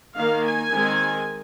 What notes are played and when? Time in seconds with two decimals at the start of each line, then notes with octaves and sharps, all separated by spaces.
0.16 D#3 A#3 F5
0.44 G#5
0.72 D#3 G#3 C4